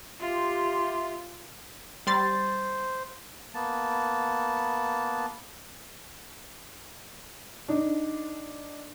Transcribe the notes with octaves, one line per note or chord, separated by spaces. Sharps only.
F4 G4 E5 C6
G3 C5 C6 A6
A#3 B3 A5
D4 D#4